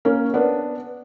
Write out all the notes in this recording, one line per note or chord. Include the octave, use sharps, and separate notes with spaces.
A#3 C#4
B3 D4